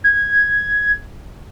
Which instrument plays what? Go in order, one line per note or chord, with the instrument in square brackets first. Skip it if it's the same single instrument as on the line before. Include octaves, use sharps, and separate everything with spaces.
[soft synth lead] G#6